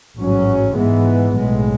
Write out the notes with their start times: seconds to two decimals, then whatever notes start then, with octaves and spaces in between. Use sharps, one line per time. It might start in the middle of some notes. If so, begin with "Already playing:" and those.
0.17 A1 G#2 F#3 C#4
0.76 G#2 E3 G#3 B3
1.35 B1 A2 G#3